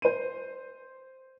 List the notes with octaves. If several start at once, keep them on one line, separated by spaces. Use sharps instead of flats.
C5 D#7